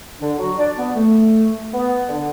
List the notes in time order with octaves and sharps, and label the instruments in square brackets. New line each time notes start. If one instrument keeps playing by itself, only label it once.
[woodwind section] D3 D4
F#3 F#4
D4 D5
B3
A3
B3
D3 D4